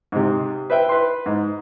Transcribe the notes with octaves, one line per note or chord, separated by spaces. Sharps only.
G#2 C3
B4 C5 E5 G5
B4 C6
G#2